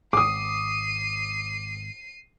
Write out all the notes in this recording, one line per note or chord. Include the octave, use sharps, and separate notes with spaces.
G#1 D6 D#6 C7 D#7